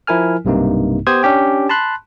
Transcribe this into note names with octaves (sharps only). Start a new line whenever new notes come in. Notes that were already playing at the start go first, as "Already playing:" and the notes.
F3 E4 A#4 G#5 F6
B1 G2 C3 A#3 D#4
B3 G4 C5 D#6 G#6
C#4 D4 G4 G5
A5 B5 C6 F#6